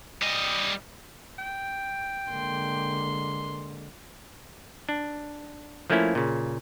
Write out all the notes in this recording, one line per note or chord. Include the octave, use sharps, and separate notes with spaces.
G3 D#5
G5
D3 G#3 A#3 C6
D4
F3 A3 A#3 C#4 E4
A#2 C#3